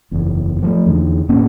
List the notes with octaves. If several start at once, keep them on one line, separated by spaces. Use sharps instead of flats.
F#1 E2
F3 G3 A3
E2 D3
A2 A#3 B3 C#4